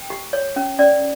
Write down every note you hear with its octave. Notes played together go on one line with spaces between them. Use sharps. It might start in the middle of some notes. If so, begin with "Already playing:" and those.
Already playing: G5
G4
C#5
C#4
C#4 D5